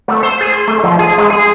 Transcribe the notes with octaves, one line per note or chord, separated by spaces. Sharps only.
A3
C5
G#4
C6
A3
F3
G#4
G#3
G#4